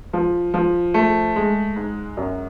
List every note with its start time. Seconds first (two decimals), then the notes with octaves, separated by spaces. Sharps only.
0.13 F3
0.54 F3
0.94 A3
1.36 G#3
1.76 G#2
2.17 F#2